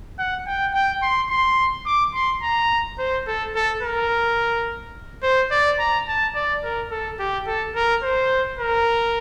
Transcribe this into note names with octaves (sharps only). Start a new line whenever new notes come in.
F#5
G5
G5
C6
C6
D6
C6
A#5
C5
A4
A4
A#4
C5
D5
A#5
A5
D5
A#4
A4
G4
A4
A#4
C5
A#4